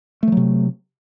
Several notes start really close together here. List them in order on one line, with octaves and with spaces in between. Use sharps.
A3 F3 F#3 C3